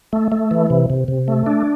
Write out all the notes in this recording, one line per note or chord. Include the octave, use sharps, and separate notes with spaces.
A3
A3
E3
C3
C3
C3
A3
D4